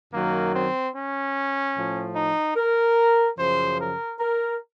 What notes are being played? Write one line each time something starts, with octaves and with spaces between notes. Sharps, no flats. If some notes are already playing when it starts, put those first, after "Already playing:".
F#2 D#3 F#3 A#3
C4
C#4
A2 F3
D#4
A#4
F#2 C#3 F3 C5
A#4
A#4